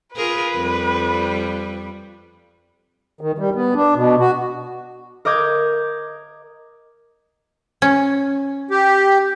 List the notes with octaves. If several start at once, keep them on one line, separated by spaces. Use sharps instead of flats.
F4 G#4 A#4 B4
F2 G3
D#3
G3
B3
D4
B2
F#4
A#4 D#5 D6 G6 G#6
C#4
G4